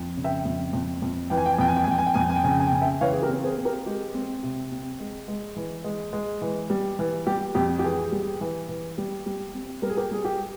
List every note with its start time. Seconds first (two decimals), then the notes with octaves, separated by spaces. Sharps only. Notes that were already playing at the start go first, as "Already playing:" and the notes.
Already playing: F2
0.17 C#3
0.24 E5 G5
0.45 F2
0.73 F2
1.02 F2
1.30 E3 G5
1.38 G#5
1.46 G5
1.53 G#5
1.58 F2 G5
1.68 G#5
1.76 G5
1.84 G#5
1.88 F2 G5
1.98 G#5
2.07 G5
2.14 F2 G#5
2.21 G5
2.29 G#5
2.36 G5
2.44 C#3 G#5
2.51 G5
2.60 G#5
2.67 G5
2.72 C#3 G#5
2.82 E5 G5
3.01 E3 C#5 F5
3.13 G#4
3.22 G4 A#4
3.29 C4
3.44 G#4 C5
3.58 C4
3.65 G4 A#4
3.86 G#3 G4
4.14 C4
4.43 C3
4.72 C4
5.00 G#3
5.28 G#3
5.56 E3
5.84 G#3
6.13 G#3
6.42 E3
6.70 G3
6.99 E3
7.27 G3 G4
7.55 F2 G4
7.79 G4
7.84 E3 G#4
8.12 G3
8.41 E3
8.69 E3
8.98 G3
9.26 G3
9.54 C4
9.82 G3 A#4
9.90 G#4
9.97 G4 A#4
10.11 G3 G#4
10.25 G4